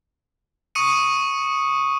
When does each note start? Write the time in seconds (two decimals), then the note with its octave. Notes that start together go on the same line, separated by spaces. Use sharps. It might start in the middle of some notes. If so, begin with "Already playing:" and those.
0.75 C#6 D#6 C#7 D#7